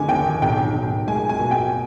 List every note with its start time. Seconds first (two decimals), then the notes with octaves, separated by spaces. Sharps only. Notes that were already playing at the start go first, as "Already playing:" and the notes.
Already playing: F1 D3 G#5 D6
0.08 D#2 G5
0.42 B1 G5
0.75 B1
1.07 G#3 G#5
1.29 G#5
1.40 B2
1.51 G5